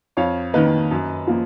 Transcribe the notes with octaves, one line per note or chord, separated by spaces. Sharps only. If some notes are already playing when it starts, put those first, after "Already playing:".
F2 C#5 F5
D#3 A#3 B4 D#5
F#2
F3 A#3